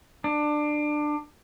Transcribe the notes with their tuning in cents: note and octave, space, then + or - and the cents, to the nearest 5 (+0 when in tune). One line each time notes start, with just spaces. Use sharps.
D4 +20